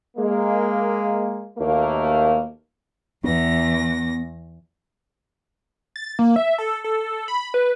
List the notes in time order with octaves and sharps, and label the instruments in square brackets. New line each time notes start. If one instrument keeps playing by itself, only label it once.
[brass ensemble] G#3 A#3
D#2 B2 A3 A#3
[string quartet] E2 A#6 [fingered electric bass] B3
[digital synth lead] A6
A#3
E5
A4
A4
B5
B4